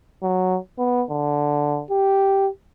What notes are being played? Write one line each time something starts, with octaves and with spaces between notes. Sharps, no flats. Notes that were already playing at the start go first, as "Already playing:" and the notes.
F#3
B3
D3
G4